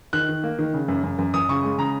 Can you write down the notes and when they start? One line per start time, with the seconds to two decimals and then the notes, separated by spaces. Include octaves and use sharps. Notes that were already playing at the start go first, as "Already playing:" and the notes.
0.13 D#3 F#6
0.29 D#3
0.44 A#3
0.59 D#3
0.74 C#3
0.88 F#2
1.04 F#2
1.19 F#2
1.34 F#2 D#6
1.49 C#3 C#6
1.64 G#3
1.78 C#3 A#5